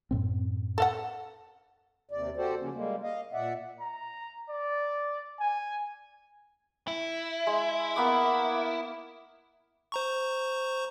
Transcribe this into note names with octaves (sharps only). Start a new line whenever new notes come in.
F#2 A2 C4
A4 F5 F#5
D#2 C3 D5
F#4 G4 A4 C5 D5
C#3 F3 A#3 C#4
G3 G#3 A#3
D#5 F5
A#2 D5 E5 F#5
A#5
D5
G#5
E4
G#3
A#3 B3 D6
C5 A#5 C#6